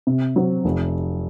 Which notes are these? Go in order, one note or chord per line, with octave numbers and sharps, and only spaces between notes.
C3
F#3 C4
F1